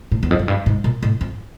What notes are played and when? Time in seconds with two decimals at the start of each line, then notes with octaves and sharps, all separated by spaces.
0.12 A2
0.23 E2
0.31 F2
0.39 F#2
0.48 G2
0.66 G#2
0.84 A#2
1.03 A2
1.21 F2